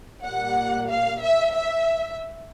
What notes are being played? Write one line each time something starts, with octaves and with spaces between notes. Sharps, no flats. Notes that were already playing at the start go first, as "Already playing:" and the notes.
A#2 G3 A#3 F#5
F5
E5
E5